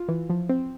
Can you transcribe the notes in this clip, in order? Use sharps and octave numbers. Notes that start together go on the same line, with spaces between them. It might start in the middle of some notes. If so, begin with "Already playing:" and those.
Already playing: F4
E3
F3
C4